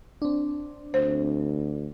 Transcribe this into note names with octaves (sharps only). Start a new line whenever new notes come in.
C4 D4
D2 C5